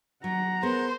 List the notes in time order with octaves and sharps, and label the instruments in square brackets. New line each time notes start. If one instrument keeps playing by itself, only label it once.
[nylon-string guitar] F#3 [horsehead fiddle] F#5 A#5
[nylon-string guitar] B3 G#4 A#4 [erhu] C5